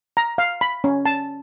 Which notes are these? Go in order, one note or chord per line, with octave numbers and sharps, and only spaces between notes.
A#5
F5
B5
C#4
A5